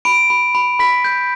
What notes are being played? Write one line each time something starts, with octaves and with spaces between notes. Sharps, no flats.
B5 D7
B5
B5
B5 B6
G6